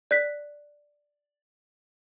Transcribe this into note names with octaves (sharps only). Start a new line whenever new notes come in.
D5 F#6 B6